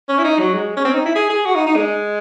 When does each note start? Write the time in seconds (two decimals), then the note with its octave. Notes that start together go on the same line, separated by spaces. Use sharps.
0.09 C#4
0.19 E4
0.24 D#4
0.39 F#3
0.54 G#3
0.77 C#4
0.85 C4
0.94 D#4
1.06 E4
1.15 G#4
1.30 G#4
1.46 F#4
1.55 D#4
1.66 D#4
1.76 G#3